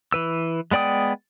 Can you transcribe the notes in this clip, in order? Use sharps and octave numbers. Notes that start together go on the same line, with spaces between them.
E3 B4 E6
G#3 B3 D5 G5 D#6